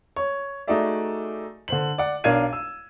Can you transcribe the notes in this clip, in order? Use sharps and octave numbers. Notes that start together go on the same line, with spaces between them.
C#5
A3 D#4 F#4 G#4 D5 E5
D3 C5 F#7
D5 F#5
B1 D4 A#4 F5 G#6 D#7
E6